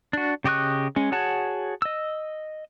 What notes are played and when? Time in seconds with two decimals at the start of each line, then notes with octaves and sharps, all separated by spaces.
0.13 D4 F#4
0.44 C#3 G4 D#5 C#6 F#6
0.96 G#3 C#4
1.12 F#4 G#4 C#5 F#5 A5
1.82 D#5 E6